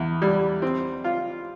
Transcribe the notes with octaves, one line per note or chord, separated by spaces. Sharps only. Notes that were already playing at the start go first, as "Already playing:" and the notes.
Already playing: E2
G3
C4
F4